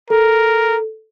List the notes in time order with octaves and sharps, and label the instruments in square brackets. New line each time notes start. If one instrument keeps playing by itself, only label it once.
[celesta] A4 [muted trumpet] A#4